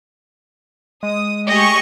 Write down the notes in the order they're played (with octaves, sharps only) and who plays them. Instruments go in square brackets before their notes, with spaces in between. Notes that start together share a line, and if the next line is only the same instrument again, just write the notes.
[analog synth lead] G#3 [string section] D#6
[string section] A3 G4 G#4 [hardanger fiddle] D#5 [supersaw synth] C#6